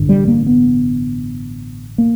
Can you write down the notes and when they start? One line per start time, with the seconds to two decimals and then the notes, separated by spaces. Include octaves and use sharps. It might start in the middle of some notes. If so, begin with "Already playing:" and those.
Already playing: A1 G2 D3
0.09 G3
0.28 A#3
0.46 B3
1.98 A#3